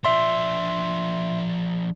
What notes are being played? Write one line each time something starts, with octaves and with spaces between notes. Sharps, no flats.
F3 D4 E5 C6